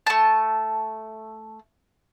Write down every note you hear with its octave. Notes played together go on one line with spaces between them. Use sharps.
A3 A5